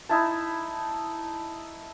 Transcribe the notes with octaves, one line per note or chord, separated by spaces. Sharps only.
D#4 E4 A5